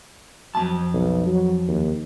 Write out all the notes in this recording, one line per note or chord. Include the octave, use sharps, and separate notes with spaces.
F2 F#3 G#3 A5
B1
F#3
D#2